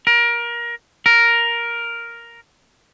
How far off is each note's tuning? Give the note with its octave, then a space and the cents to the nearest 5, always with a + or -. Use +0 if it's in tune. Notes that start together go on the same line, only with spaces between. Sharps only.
A#4 +25
A#4 +5